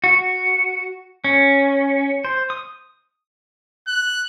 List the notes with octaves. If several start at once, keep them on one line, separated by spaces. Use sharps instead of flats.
F#4
C#4
C5
D#6
F#6